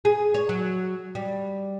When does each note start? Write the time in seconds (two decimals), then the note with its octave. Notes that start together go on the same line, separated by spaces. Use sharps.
0.05 G#4
0.34 C#5
0.49 F#3
1.15 G3